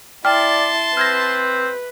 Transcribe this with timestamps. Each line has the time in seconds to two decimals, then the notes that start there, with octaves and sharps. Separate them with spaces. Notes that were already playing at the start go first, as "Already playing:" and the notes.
0.25 E4 D5 G5 A5 C6 F6
0.97 C4 B4 F6 G#6 A#6